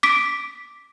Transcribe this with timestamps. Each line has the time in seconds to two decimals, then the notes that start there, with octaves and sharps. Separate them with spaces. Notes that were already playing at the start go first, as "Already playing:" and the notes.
0.03 D6 B6 D7